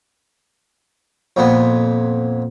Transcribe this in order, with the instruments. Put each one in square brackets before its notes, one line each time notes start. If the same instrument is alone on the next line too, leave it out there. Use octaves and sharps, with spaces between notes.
[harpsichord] F2 A#2 B3